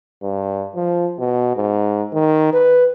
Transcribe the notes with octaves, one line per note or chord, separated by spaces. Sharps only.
G2
F3
B2
G#2
D#3
B4